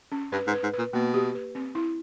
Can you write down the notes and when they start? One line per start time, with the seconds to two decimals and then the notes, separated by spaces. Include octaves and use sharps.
0.12 C#4
0.32 G2 B4
0.47 G#2
0.53 B4
0.63 G#2
0.73 B4
0.79 A#2
0.93 B2 A#3
1.14 G4
1.35 B4
1.55 C4
1.75 E4